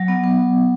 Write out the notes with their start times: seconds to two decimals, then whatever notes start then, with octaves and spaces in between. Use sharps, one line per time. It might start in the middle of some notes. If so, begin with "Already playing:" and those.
Already playing: F#3
0.08 B3
0.24 B3